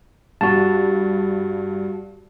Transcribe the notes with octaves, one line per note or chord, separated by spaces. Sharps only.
G2 F#4 A5